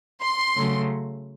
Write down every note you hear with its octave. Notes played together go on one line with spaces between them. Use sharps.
C6
C#3 F#3 A3